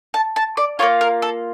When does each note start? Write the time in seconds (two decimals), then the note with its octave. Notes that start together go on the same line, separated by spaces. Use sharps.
0.14 A5
0.36 A5
0.57 D5
0.79 A#3 D4 F4 C#5
1.01 A#4
1.22 A4